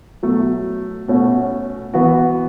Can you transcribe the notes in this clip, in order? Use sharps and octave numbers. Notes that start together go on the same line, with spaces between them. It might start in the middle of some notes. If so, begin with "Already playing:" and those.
B2 F#3 A3
B2 A3 C#4 F#4
E3 B3 F#4